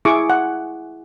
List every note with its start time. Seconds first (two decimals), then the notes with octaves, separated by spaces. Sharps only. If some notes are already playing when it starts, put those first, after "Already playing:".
0.05 E4 G#4 C#6 D6
0.30 F#5